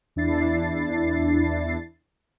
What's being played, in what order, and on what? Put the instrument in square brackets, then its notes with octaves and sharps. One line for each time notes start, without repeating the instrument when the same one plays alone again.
[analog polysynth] E2 D4 E4 A6 C7